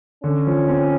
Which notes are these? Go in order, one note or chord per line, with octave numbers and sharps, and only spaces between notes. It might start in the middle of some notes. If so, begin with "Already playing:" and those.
D3 C#4
F3
C4